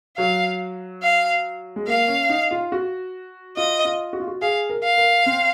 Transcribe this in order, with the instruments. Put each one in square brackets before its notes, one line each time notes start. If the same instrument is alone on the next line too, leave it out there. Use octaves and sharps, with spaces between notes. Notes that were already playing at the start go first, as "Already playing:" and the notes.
[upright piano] F#3 [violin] F5
[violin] F5
[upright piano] G#3
[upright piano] A#3 [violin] F5
[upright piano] C#4
D#4
F4
F#4
[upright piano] F4 [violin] D#5
[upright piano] F4
F#4
F4
F#4
[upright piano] G#4 [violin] F5
[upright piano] A#4
[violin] F5
[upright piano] A#4
C4